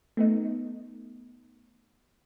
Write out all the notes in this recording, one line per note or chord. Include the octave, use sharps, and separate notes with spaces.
A3 B3 D#4